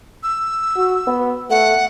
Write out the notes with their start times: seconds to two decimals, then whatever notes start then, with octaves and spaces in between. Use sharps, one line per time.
0.23 E6
0.76 F#4
1.07 B3
1.50 A3 F#5